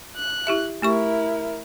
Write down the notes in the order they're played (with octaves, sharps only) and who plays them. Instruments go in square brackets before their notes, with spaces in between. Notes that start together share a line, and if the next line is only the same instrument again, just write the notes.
[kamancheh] F#6
[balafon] E4 G4 E5
[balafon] A3 G4 C#6 [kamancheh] E4 A#4